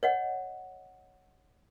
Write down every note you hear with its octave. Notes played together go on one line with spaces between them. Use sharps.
C#5 D#5 F#5